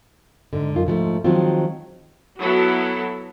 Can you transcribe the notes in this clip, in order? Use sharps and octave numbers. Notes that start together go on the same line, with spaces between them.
G#2 D3
F#2 D#4 F4
G#2 F3 G3 A3
D#3 F3 F#3 G#3 C4 F4
F#3 B3 E4 F#4 A4